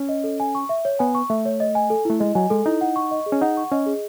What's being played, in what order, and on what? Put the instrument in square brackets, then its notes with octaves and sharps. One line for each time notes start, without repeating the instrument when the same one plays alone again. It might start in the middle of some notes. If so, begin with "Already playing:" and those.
Already playing: [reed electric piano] C#4
[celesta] D#5
A4
G#5
C#6
E5
C#5
[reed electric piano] B3 [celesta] G#5
[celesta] C#6
[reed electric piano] A3 [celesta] E5
[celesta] C#5
D#5
G#5
A4
[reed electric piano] A3 [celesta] E4
[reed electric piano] G#3 [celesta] D#5
[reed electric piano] F#3 [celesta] G#5
[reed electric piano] G#3 [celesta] A4
[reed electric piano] D#4 [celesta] E4
[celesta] F#5
C#6
D#5
G#4
[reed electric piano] C#4
[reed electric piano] D#4 [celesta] F#5
[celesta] C#6
[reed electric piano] C#4 [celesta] D#5
[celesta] G#4